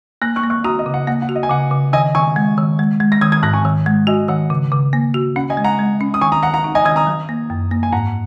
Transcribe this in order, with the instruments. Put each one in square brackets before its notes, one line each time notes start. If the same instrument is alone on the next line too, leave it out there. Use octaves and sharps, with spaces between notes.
[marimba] A#3 [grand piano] F#6 A#6
[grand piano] C#6 F#6
[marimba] A#3
[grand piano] C#6 F#6
[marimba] F#4 [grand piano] A#5 D#6
[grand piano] D#5
[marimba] C#3
[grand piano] F#5
[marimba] A#3 [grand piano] F#5
[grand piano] F#5
[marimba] F#4
[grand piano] D#5
G#5
[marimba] C#3 [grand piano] F#5
[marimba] C#3
[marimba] D#3 [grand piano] D#5 G#5
[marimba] D#3 [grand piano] G#5 C#6
[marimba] G#3
D#3
G#3
G#3
[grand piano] A#6
[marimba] D#3 [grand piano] D#6 G#6
[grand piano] D#6 G#6
[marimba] G#2 [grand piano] F#6 A#6
[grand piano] G#5 C#6
[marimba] D#3
G#3
[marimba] F#4 [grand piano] D#5 G#5
[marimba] D#3 [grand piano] F#5
[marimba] C#3
C#3
A#3
F#4
[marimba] C#4 [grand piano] F#5
[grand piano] D#5 G#5
[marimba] G#3
[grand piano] F#5 A#5
[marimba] G#3
C#4
[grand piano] D#6
[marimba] D#3 [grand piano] G#5 C#6
[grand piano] A#5 D#6
[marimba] D#3 [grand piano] F#5 A#5
[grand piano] F#5 A#5
[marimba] D#4
[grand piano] D#5 G#5
[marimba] D#3 [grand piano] D#6 G#6
[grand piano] A#5 D#6
[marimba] F#3
A#3
F#2
A#3
[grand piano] G#5
[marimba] G#2 [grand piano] F#5 A#5